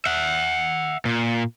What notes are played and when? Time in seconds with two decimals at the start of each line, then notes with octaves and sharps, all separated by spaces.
0.06 E5 F#5
1.05 A#2